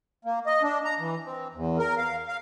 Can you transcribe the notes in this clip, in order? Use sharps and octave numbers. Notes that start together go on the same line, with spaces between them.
A#3
D#5
D4
A#5
E3
C4
E2
A#4
F5
F5